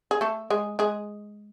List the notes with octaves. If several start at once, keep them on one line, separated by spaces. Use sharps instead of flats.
G#4
A3 A4
G#3 G#4
G#3 G#4